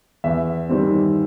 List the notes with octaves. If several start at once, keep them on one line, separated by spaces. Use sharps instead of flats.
E2 E5
D#3 G3 C4